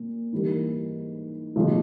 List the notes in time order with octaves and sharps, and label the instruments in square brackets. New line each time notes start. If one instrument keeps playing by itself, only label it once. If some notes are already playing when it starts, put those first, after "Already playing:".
Already playing: [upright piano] A#2 A#3
G#2 E3 G3 A#3
B1 A2 F3 G#3